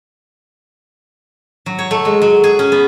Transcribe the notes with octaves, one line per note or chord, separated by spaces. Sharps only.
F#3
C#5
A3
G#3
F#3
G#4
C#4
B3